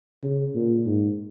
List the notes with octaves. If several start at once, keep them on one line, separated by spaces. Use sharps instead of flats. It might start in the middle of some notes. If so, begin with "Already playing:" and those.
C#3
A#2
G#2